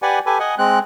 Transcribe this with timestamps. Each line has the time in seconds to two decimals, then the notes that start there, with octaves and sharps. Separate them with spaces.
0.02 G4 B4 D5 F#5 G#5
0.26 G4 A4 B4 G#5
0.39 D#5 F#5 G#5
0.58 G#3 C4 F#6